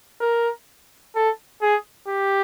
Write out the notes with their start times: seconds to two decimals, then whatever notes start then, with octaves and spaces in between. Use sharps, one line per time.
0.21 A#4
1.15 A4
1.62 G#4
2.08 G4